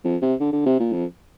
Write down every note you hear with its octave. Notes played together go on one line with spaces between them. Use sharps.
F2
C3
D3
D3
C3
A#2
F2